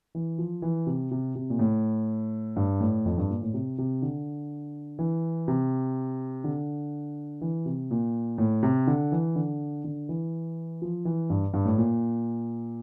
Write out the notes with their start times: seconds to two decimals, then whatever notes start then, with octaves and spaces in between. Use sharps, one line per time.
0.15 E3
0.38 F3
0.62 E3
0.87 C3
1.11 C3
1.35 C3
1.50 A#2
1.59 A2
2.56 G2
2.81 A2
3.05 F2
3.18 G2
3.30 A#2
3.42 A2
3.54 C3
3.78 C3
4.02 D3
4.99 E3
5.48 C3
6.44 D3
7.41 E3
7.66 C3
7.91 A#2
8.38 A2
8.63 C3
8.87 D3
9.12 E3
9.36 D3
9.84 D3
10.09 E3
10.82 F3
11.05 E3
11.30 G2
11.53 G2
11.65 A2
11.78 A#2